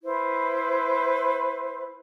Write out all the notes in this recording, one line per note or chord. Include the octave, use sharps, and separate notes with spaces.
E4 B4 C5